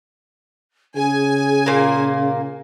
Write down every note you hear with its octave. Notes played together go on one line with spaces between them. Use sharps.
C#3 G#4 G#5
A#2 A#3